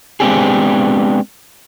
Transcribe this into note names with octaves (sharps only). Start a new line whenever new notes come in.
G#3 B3 C4 D4 G4 G#4